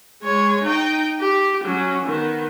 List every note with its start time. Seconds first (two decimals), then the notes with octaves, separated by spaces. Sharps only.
0.22 G#3 C#5
0.64 D#4 G5
1.20 G4
1.64 F#3 C#4
2.05 D#3 B3